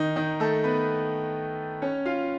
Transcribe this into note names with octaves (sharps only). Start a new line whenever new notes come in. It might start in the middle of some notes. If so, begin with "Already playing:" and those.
Already playing: D#3 D#4
D#3 D#4
A3 A4
B3 B4
C#4 C#5
F4 F5